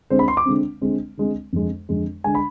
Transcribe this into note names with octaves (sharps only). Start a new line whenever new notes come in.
D3 G#3 C4 C5
B5
C6
D6
D3 G#3 C4
D3 G#3 C4
D3 G#3 C4
F2 D3 G#3
F2 D3 G#3
D3 G#3 G#5
B5